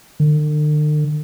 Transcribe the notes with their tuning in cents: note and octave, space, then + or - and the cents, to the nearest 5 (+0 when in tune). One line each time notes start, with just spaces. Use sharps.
D3 +45